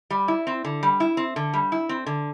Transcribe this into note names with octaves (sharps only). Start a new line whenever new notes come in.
G3
E4
C4
D3
G3
E4
C4
D3
G3
E4
C4
D3